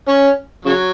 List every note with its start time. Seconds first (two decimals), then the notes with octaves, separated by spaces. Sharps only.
0.08 C#4
0.65 C#3 F#3